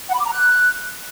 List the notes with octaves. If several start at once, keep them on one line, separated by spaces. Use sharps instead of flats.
F#5
B5
D6
A#5
F#6